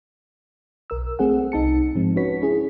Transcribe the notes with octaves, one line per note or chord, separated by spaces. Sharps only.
B1 A#4 E6
A3 C4 G#4 F#5
C2 D#4 A5 C#7
G#2 F3 G#3 C4
C#4 F#4 B4 C#5 B6
C#4 E4 G#4